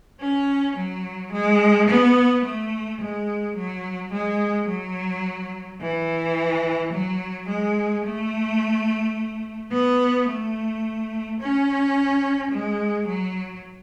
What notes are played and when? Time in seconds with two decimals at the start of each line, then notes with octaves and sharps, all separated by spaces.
0.20 C#4
0.76 F#3
1.32 G#3
1.89 B3
2.44 A3
3.01 G#3
3.56 F#3
4.12 G#3
4.67 F#3
5.81 E3
6.92 F#3
7.48 G#3
8.04 A3
9.72 B3
10.28 A3
11.40 C#4
12.51 G#3
13.07 F#3